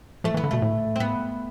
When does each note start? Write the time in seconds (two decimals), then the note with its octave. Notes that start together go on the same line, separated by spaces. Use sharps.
0.24 F3 A3
0.34 E3
0.37 B3
0.44 D3
0.51 B2 A3
0.62 A2
0.96 C4
1.00 B3